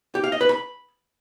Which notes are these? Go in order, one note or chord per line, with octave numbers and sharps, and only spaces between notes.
G4
F5
D#5
B4
B5